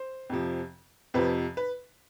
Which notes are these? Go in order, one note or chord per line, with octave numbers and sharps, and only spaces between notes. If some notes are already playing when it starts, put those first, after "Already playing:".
Already playing: C5
F2 C3 F3
F2 C3 F3 B4
B4